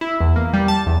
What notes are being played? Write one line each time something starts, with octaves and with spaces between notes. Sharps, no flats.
E4
E2
A#3
G3
A5
E2